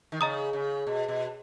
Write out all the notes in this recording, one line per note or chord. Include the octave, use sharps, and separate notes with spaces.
D#3
C#3 D#5 A#5 D#6
C#3
B2
B2